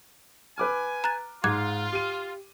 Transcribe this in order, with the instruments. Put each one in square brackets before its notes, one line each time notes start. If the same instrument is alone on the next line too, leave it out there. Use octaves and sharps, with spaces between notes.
[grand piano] B4 D6 F6 [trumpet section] G#5
[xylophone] A#5 F#6 A6
[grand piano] G#2 [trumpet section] F4 [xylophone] D6 F#6 G#6
[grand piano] G4 D#7